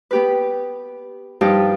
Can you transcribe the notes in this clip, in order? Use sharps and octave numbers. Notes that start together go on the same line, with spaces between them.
B3 G4 B4
G2 F3 D#4 F4 G4 A5